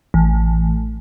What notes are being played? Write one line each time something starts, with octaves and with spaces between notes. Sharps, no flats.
A1